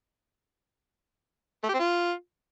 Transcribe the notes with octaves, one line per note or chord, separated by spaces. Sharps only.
A3
G4
C4
F4